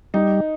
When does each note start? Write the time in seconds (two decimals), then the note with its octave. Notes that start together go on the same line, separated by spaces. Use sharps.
0.14 G3 D#4